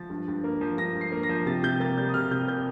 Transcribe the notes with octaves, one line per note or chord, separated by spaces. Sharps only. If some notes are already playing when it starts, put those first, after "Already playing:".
Already playing: F3 A6
G2
G2
A#3
F3
G2 A#6
G2
C7
A#3
A#6
F3
C3 A6
C3 G6
A#3 A6
G3 G6
D#6
C3 F6
C3 G6
A#3 G6